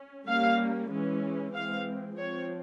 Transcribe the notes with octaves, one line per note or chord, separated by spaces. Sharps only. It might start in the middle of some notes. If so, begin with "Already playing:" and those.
Already playing: C#4
G3 A#3 C#4 F5
E3 G#3 C#4
E3 G#3 C4 F5
F3 C4 C#5